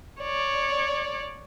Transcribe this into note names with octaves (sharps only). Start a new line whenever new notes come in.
C#5 D5